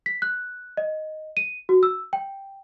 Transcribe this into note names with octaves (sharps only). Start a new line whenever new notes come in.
B6
F#6
D#5
D#7
F#4
E6
G5